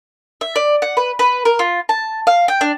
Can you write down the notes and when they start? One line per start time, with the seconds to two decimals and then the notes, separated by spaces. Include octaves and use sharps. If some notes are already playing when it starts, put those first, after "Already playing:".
0.41 E5
0.56 D5
0.82 F#5
0.97 B4
1.19 B4
1.45 A#4
1.59 F4
1.89 A5
2.27 F5
2.48 G5
2.61 D4